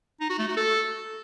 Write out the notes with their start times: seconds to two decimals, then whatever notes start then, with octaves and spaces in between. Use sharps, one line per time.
0.21 D#4
0.30 F#4
0.39 A3
0.48 F#4
0.57 A4